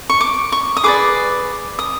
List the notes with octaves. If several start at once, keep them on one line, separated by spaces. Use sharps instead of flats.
C#6
D6
C#6
D#6
G#4 B4 D5 D6
D#6